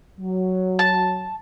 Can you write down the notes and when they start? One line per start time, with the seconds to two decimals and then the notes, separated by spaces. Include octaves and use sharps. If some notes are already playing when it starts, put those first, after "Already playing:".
0.19 F#3
0.79 A5